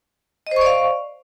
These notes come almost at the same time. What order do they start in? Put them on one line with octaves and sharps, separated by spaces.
D#5 C5 C#6 D5 F5